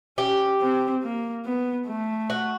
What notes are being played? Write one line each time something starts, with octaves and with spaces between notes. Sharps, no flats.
C#4 G4
C4
A#3
B3
A3
F#4